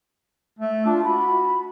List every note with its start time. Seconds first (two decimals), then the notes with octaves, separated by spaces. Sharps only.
0.59 A3
0.86 D4 F4
1.05 F#4 B5